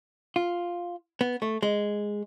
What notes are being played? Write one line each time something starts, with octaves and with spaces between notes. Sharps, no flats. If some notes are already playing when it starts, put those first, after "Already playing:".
F4
B3
A3
G#3